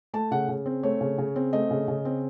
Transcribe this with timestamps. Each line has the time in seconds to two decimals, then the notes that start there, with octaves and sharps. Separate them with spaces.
0.13 A3 A5
0.31 C#3 F#5
0.48 C#3
0.66 C4
0.83 A3 C#5
1.01 C#3
1.18 C#3
1.36 C4
1.53 A3 D#5
1.71 C#3
1.88 C#3
2.05 C4